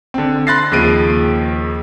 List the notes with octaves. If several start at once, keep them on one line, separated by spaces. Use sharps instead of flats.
D3 C4
B5 C6 F#6 A6 A#6 C7
D#2 C#3 F3 A#6 D7 D#7